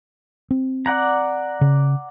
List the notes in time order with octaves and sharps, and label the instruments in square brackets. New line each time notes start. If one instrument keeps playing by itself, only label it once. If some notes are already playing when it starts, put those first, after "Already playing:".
[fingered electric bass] C4
[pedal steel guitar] D5 F#5 A#5
[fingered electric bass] C#3